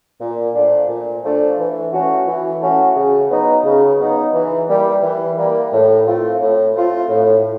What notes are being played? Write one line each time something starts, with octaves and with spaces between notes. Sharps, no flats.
A#2
F3 A3 D4
A#2
F3 A3 D4
E3
A3 C#4 F#4
E3
A3 C#4 F#4
C#3
F#3 B3 D#4
C#3
F#3 B3 D#4
E3
G3 A#3
E3
G3 A#3
A2
F3 A3 C4 F4
A2
F3 A3 C4 F4
A2